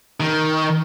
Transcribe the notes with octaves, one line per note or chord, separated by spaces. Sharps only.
D#3